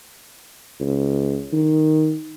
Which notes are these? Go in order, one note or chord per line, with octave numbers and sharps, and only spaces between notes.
C#2
D#3